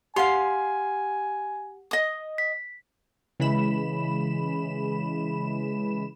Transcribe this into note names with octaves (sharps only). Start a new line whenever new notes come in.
G4 F5 F#5 G#5 C6
D#5 D#6
B6
C#3 E3 G#3 B5 E7